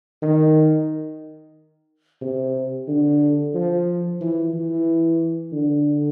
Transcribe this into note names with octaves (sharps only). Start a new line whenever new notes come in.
D#3
C3
D3
F3
E3
E3
D3